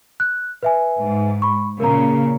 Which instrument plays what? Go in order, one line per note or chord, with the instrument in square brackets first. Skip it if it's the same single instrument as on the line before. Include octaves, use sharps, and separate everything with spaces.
[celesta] F#6
B4 E5 G#5
[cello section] G#2
[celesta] B5 C#6
[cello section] A#2 C#3 [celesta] A#4 A#5